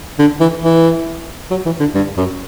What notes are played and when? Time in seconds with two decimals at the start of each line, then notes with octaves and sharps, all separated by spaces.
0.19 D3
0.41 E3
0.63 E3
1.51 F#3
1.66 E3
1.80 D3
1.95 G2
2.17 F#2